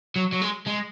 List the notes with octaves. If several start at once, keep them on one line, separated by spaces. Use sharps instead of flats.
F#3
F#3
G#3
G#3